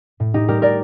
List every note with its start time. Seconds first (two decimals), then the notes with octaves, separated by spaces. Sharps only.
0.20 A2
0.34 D#4 G4
0.48 G3 G4 A#4
0.62 A#4 D5